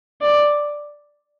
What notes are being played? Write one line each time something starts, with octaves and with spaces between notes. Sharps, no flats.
D5